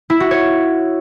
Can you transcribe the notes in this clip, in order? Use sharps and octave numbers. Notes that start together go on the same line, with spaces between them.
E4
F#4
C#5